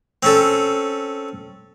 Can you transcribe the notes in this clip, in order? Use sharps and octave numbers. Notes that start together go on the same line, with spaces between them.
C4 C#4 A4